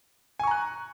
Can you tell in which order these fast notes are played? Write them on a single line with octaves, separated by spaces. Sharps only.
G#5 C#6 A#5 F#6